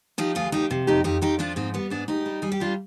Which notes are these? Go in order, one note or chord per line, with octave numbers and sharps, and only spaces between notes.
F3 D#4 G4
D2 F4 G#4
F3 D#4 G4
C3
F2 D#4 G4
F2 D#4 G4
F2 D#4 G4
F3 D4 F4
G#2 C4 D#4
G3 B3
G#2 B3 D4
G#2 D#4 G4
G3
G3 G#4
G4
G3 D4 F4